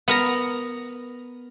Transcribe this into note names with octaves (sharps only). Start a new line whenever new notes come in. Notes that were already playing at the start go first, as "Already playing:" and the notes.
B3 A#4 A#5